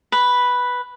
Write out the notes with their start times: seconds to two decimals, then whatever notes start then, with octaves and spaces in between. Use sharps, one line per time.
0.12 B4